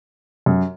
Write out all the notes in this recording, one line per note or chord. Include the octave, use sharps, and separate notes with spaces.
F#2